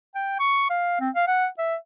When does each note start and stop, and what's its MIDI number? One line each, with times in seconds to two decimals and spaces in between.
0.15 0.35 79
0.40 0.65 85
0.70 0.96 77
1.00 1.10 60
1.15 1.26 77
1.27 1.47 78
1.58 1.75 76